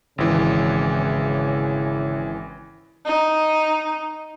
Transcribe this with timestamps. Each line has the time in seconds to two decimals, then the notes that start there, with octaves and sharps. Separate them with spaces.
0.18 G#1 C#3 E3
3.06 D#4